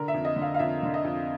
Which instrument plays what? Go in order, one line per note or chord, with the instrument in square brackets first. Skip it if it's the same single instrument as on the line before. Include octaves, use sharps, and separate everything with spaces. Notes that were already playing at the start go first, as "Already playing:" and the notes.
Already playing: [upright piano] D3 A#4
E5
F2
D#5
D3
F5
F5
F2 E5
D3
D#5
F2